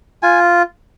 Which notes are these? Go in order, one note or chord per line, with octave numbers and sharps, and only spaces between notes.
F4 G#5